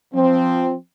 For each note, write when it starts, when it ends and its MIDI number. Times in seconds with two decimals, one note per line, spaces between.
0.14 0.74 53
0.14 0.74 60